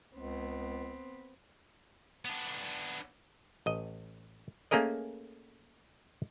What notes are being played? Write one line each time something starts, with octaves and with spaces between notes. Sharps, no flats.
C#2 B3 C4
B3 D4
A1 D#5
A3 A#3 C#4 G#4 A#4 D#5